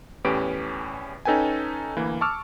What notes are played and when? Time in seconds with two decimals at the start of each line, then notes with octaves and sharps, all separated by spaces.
0.25 E2 A2 C#4 G4 B4 D7
1.25 C#4 D#4 A4 B4 G5 G#5
1.96 D2 E3 A#3
2.21 A5 C#6 D6 E6 F6